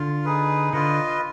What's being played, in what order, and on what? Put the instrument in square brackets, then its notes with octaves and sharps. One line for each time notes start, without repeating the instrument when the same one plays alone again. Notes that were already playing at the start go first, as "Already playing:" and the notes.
Already playing: [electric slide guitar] D3 [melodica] F4
[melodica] D#4 G#4 B4
[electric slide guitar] D3 [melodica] F4 B4 D#5